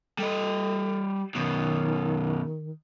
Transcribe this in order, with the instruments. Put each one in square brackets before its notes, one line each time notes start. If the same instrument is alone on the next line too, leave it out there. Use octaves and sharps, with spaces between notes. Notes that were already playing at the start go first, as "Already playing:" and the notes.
[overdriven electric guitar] G3 D#5 [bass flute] A4
[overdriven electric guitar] F#2 B2 [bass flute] D#3